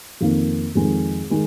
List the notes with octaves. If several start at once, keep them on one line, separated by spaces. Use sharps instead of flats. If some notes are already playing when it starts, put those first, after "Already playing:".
F2 D#3 A#3
F2 D#3 G#3
D#3 G#3